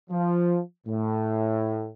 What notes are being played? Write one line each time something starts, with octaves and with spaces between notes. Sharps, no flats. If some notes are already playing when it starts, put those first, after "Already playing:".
F3
A2